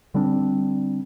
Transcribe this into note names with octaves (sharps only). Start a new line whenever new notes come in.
D3 G3 C4 D4